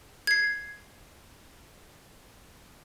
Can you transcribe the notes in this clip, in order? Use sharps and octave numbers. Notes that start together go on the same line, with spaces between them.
G#6 C7